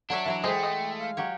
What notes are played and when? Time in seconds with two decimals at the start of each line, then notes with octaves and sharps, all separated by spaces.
0.10 F#3 D4 C#5 E5
0.26 E3 F#3 E5 A#5
0.44 G#3 A3 G#4 C5 D#5 G5
0.63 D#5
0.98 F5
1.17 F#3 G4 C#5